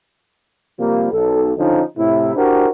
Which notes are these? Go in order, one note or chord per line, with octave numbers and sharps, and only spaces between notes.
C3 F3 G3 A#3
B1 A4
D3 F3 C#4 D#4
A2 C3 E4
D4 E4 F#4 G4 A#4 C5